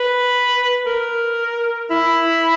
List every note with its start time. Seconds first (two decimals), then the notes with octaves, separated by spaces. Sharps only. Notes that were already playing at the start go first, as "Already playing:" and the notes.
Already playing: B4
0.86 A#4
1.91 E4